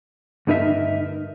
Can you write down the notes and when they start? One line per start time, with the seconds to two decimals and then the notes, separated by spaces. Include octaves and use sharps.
0.47 D2 G2 D#4 A#4 E5